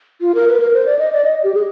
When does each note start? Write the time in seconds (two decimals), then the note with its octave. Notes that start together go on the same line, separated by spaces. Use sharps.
0.21 F4
0.35 A#4
0.48 B4
0.60 A#4
0.73 C5
0.86 D5
0.99 D#5
1.13 D5
1.25 D#5
1.44 G4
1.55 G#4